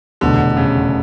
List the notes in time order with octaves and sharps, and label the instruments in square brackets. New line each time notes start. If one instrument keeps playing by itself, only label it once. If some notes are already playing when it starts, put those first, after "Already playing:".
[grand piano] F1 E2 B2 F#3 [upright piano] D3
[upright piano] C#3